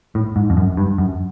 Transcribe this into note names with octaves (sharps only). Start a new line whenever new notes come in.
A2
G#2
F2
F#2
G2
F#2